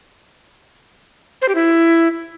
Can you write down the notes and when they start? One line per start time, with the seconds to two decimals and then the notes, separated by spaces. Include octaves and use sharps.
1.42 C5
1.48 G4
1.55 E4